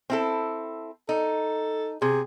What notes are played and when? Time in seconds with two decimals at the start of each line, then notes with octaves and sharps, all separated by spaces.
0.10 C4 E4 A4
1.09 D#4 A4
2.02 C3 G#4